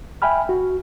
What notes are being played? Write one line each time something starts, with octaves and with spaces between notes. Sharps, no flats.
E5 G5 G#5 B5 F6
F#4